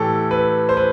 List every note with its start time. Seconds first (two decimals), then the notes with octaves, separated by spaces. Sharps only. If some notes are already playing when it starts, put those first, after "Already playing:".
Already playing: A2 E3 G4 A4
0.31 B4
0.69 C5
0.77 B4